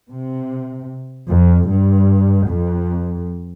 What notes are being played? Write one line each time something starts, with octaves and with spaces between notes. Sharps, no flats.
C3
F2
G2
F2